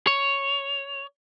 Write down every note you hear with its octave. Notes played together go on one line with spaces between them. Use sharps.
C#5